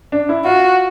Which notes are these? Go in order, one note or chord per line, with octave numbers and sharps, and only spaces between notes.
D4
E4
F4 F#4